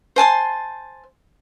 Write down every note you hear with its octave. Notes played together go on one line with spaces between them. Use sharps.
C5 G#5 A5 C6